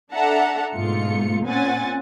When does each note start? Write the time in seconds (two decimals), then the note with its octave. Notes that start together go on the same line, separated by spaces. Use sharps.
0.13 D4 A4 E5 F#5 A5 A#5
0.74 G#2 B2 A3 F4 C#7
1.45 A#2 C4 C#4 F#5 G#5 A6